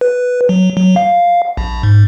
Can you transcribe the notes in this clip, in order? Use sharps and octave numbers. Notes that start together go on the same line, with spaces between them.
B4
F#3
F#3
F5
A#1
G#2